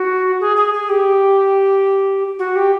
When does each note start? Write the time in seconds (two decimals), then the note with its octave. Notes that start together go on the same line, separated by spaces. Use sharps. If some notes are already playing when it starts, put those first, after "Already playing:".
Already playing: F#4
0.40 G#4
0.57 G#4
0.74 G#4
0.89 G4
2.39 F#4
2.56 G4